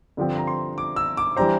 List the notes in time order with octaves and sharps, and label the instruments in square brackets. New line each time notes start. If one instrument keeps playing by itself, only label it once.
[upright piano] G2 D3 F3 C4 G4
[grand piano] A#5
C6
D6
E6
D6
[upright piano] E3 G3 D4 G4 C5 [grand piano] A#5